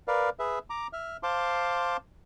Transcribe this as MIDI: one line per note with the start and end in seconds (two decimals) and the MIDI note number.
0.08 0.30 70
0.08 0.30 71
0.08 0.30 74
0.08 0.30 77
0.39 0.59 68
0.39 0.59 71
0.39 0.59 76
0.70 0.87 82
0.70 0.87 86
0.93 1.17 76
0.93 1.17 89
1.23 1.97 72
1.23 1.97 77
1.23 1.97 81
1.23 1.97 84
1.23 1.97 86